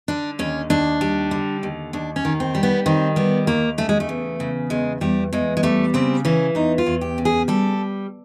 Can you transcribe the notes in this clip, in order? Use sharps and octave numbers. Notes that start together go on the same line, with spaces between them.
D3 D4
D#2 C#4
D#2 D4
G3
D3
D#2
D#2 D4
C#4
D#3
C4
G3
B3
D#3 C4
G3 B3
D#2 A#3
C#3 A3
G#3
A3
E2
C#3
E2 G#3
E2 G3
E2 G#3
G#3
G3 A3
C#3 C4
E3 C#4
E2 D#4
F4
E2
G4
C#3
G#4
G3 A4